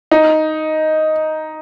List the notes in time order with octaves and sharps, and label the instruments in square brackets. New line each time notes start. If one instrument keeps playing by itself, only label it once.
[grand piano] D#4